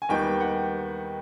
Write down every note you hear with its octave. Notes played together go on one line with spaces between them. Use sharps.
G#5
D#2 D#3 G3 B3 G5
F#5